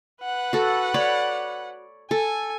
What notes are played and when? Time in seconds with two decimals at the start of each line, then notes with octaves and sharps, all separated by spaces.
0.23 B4 F#5
0.53 F#4 A4
0.94 C#5 D5 B5
2.11 A4 G#5